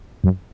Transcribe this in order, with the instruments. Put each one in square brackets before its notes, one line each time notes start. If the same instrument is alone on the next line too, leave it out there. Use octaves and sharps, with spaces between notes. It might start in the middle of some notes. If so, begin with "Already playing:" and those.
[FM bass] F#2